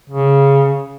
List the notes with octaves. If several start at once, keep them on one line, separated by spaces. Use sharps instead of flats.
C#3